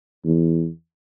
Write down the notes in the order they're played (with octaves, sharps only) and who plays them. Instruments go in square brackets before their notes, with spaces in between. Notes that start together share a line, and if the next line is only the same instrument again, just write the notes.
[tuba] E2